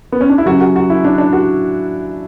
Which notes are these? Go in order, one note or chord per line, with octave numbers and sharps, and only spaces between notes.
B3
C#4
D4
E4
F#2 C#3 F#3 F#4
F#4
F#4
E4
D4
D4
F#4